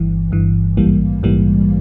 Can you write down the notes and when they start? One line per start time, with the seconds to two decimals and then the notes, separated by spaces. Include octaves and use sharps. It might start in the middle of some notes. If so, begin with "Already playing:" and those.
Already playing: G1 G2 E3
0.31 G1 G2 E3
0.77 A#1 G#2 E3 G3 A#3
1.23 A#1 G#2 E3 G3 A#3